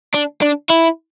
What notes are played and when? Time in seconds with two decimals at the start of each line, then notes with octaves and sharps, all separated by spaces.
0.14 D4
0.42 D4
0.70 E4